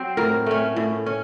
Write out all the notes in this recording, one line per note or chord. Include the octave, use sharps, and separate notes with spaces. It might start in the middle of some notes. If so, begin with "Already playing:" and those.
Already playing: F#3 C4 C5
A2 A#4
A3 C#4
A2
C#4